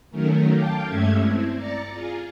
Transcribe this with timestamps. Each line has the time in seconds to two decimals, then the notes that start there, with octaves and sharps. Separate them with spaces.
0.10 D#3 F#3 A3 C#4 A#4
0.51 F5 G5 A5 D6
0.86 G2 G#3 A3 C#4 E5 G#6
1.21 C4 E4
1.55 D5 A#5 A6 C#7
1.90 F4 G#4